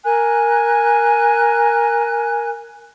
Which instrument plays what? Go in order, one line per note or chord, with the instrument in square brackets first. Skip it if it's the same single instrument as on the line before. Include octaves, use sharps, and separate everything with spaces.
[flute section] A#4 G#5 F#6